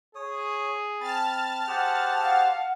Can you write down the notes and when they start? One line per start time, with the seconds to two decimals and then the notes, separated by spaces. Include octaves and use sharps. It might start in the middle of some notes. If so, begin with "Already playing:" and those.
0.15 G#4 C#5 D#6
1.01 C4 A5 B5 F6 A6
1.68 G4 G#4 C5 F#5
2.22 F5 F#5